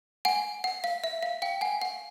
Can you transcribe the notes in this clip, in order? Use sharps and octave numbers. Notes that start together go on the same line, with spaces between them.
F#5 G#5
F#5
F5
E5
F5
F5 G5
F#5 G#5
F#5